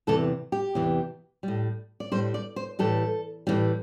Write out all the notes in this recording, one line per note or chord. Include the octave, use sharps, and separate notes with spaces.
E2 C3 E3 A4
G4
E2 C3 E3
A2 G3
D5
A2 G3 C5
D5
C5
A2 E3 G3 A4
A2 E3 G3